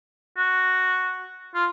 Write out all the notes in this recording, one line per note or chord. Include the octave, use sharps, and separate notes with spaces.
F#4
F4